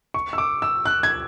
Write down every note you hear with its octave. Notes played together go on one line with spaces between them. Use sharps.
C#6
E6
D6
E6
F#6
G#6